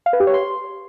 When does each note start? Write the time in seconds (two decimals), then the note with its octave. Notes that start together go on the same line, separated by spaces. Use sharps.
0.06 F5
0.13 B4
0.20 G4
0.27 C#5
0.34 C6